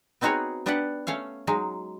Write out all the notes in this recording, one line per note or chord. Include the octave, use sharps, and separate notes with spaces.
B3 C4 D#4 F#4 G#4 C#5
B3 D4 G4 B4 D5 F#5
A3 C#4 C#5 F5
F#3 G#3 D#4